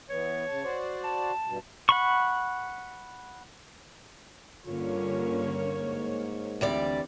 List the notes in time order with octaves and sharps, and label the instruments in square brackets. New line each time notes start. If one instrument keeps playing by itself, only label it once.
[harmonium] E3 B3 [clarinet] C#5
[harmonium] C#3 A5
F#4 C5 D5
[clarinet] A5
[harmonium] G2 B2
[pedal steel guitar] F#5 B5 C#6
[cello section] G2 D3 C#4 [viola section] A#3 C#5 [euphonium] F4
[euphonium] G#2
[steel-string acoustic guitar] D2 G3 D5 [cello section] E3 C4